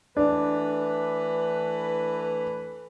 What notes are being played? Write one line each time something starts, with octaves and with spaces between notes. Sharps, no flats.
E3 A3 D4 B4